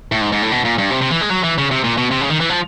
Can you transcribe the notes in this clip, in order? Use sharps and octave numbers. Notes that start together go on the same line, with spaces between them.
A2
G#2
G#2
A2
B2
A#2
G2
C3
C3
E3
G#3
F#3
E3
C#3
C3
A#2
B2
C3
C#3
D#3
E3
F3